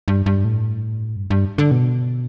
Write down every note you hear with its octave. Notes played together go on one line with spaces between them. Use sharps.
G2
G2
A2
G2
G2
D3
B2